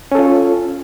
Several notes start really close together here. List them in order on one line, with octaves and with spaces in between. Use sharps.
C#4 A4 F4